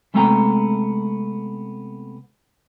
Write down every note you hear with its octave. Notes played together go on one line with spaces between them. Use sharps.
C3 G#3 A3 B3 G5 A#5